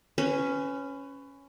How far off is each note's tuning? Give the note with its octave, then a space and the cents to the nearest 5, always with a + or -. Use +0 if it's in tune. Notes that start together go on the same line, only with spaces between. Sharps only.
C#4 +0 B4 +25